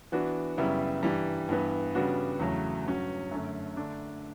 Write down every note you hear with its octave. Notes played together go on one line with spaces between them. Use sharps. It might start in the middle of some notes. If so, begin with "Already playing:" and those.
E3 B3 D4 F#4
F#2 C#3 G3 B3 E4
G2 E3 G3
G2 E3 B3
C#3 G3 B3 D4 F#4
E2 C#3 F#3 A3
G2 F#3 C#4 F#4
F#2 D3 A3 C#4
D3 A3 D4